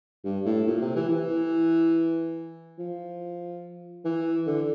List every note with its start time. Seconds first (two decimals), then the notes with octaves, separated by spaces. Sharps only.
0.25 G2
0.45 A2
0.67 A#2
0.81 C3
0.95 E3
1.09 E3
2.79 F3
4.05 E3
4.47 D3